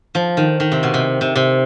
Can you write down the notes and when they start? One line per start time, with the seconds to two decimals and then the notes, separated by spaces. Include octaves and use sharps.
0.15 F3
0.37 D#3
0.60 D#3
0.72 C3
0.83 B2
0.94 C3
1.21 C3
1.36 C3